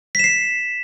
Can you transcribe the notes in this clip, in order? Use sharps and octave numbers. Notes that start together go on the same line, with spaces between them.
B6 C7 E7